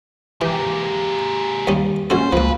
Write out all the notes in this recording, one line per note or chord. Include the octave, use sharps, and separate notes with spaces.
E3 G#3 A#3 G4
D#2 G3 C#4
A#1 C#4 F#4 A4 C5
C#2 F3 A#3 B4